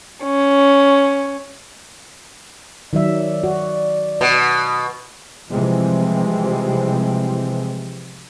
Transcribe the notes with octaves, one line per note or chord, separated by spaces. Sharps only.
C#4
D#3 F#3 D5 E5
F#4
B2
C3 E3 F3 G3 G#3 C4